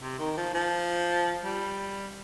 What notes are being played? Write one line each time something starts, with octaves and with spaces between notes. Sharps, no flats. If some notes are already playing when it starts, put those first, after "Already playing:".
C3
D#3
F3
F3
G3